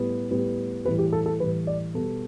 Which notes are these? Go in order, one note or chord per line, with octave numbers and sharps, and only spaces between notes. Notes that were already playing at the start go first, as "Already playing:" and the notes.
Already playing: A2 G3 B3
A2 G3 B3
A2 E3 G3 B4
G4
A4
A4
A2 E3 G3 B4
D5
B2 G3 B3 A4